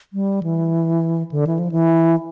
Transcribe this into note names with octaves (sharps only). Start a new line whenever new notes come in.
G3
E3
D3
E3
F3
E3